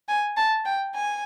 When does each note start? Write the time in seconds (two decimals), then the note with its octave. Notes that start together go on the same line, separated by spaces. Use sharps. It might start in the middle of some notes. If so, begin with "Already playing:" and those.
0.08 G#5
0.37 A5
0.66 G5
0.94 G#5